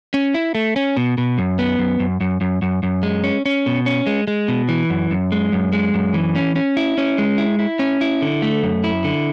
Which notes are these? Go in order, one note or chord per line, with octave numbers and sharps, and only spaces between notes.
C#4
E4
A3
C#4
B2
B2
F#2
B3
F#2
F#2
F#2
F#2
F#2
F#2
G#3
C#4
C#4
B2
C#4
G#3
G#3
B2
E3
F#2
F#2
G#3
F#2
G#3
F#2
E3
C#4
C#4
E4
C#4
G#3
E4
E4
C#4
E4
D3
A3
F#2
E4
D3